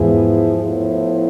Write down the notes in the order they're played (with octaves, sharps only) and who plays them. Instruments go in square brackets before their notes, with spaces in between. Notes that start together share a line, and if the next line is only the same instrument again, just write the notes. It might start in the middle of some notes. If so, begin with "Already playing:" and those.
Already playing: [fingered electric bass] E2 G#2 [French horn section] F3 B3 E4 G#4
[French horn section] A2 F3 B3 E4